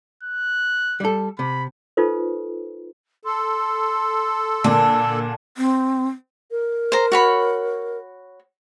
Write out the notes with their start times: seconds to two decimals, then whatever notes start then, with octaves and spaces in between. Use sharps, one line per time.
0.23 F#6
1.00 G3 A4
1.39 C3 B5
1.97 D#4 F4 A4 B4 C5
3.25 A4 C6
4.64 A#2 D3 A#3 D4
5.57 C4
6.51 A#4
6.92 C5 A#5
7.12 F#4 C#5 B5